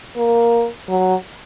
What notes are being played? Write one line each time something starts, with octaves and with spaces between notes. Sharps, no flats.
A#3
F#3